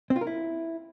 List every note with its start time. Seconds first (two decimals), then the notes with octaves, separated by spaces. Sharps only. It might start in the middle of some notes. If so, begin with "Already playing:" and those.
0.10 C4
0.16 F4
0.21 A#4
0.27 E4